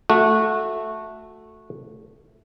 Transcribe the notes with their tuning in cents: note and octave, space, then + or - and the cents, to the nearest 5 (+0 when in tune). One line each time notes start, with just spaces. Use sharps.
A3 +0 F#4 -15